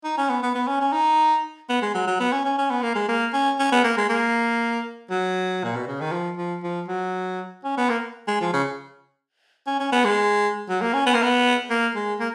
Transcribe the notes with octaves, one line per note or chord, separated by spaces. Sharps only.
D#4
C#4
B3
B3
B3
C#4
C#4
D#4
B3
G#3
F#3
F#3
B3
C#4
C#4
C#4
B3
A#3
G#3
A#3
C#4
C#4
B3
A#3
G#3
A#3
F#3
A#2
B2
C#3
D#3
F3
F3
F3
F#3
C#4
B3
A#3
G#3
F3
C#3
C#4
C#4
B3
G#3
F#3
A#3
C#4
B3
A#3
B3
A#3
G#3
A#3